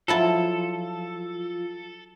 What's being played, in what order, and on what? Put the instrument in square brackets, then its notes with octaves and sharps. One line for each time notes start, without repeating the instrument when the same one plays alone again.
[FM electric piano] F3 F4 [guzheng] F#3 E4 A5 [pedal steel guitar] A4